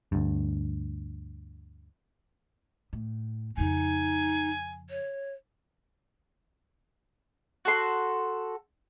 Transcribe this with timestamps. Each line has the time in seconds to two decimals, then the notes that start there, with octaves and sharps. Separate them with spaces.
0.12 D2 G2
2.93 A2
3.57 F2 C#3 D#4 G#5
4.90 C#5
7.65 F#4 A4 C6